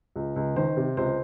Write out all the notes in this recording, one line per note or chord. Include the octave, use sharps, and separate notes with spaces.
C#2
C#2
D#3 C5
C3
C#2 C5